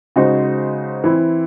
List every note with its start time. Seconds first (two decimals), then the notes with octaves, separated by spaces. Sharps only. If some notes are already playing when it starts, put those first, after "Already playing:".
0.16 C#3 G#3 D#4 F#4 C5
1.04 E3 C4 E4